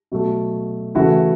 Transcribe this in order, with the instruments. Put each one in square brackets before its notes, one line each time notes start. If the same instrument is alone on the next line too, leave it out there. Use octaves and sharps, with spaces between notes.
[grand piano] B2 F#3 A3
C#3 E3 A3 E4 F#4